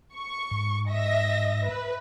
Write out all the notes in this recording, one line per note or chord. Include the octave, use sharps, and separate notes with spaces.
C#6
G#2
D#5 E5 A#6
B4